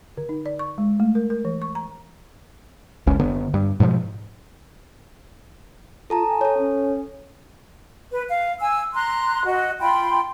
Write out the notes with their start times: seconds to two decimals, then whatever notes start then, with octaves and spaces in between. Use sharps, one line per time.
0.17 D3
0.29 D#4
0.46 D5
0.59 C#6
0.78 G#3
1.00 A3
1.15 A#4
1.30 A#4
1.45 E3
1.62 C#6
1.75 A#5
3.07 G1 C#2 C#4
3.19 F#1 D3 B3
3.54 G2
3.80 G#2 B2 D#3 F3
6.10 F4 A4 A5 A#5
6.28 G#5
6.41 A4 C#5
6.58 C#4
8.11 B4
8.28 F5
8.60 G#5 E6
8.94 A#5 C6 F#6
9.46 F#4 D#5
9.81 F4 G5 B5 C6